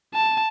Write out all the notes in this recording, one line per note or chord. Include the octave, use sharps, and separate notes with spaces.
A5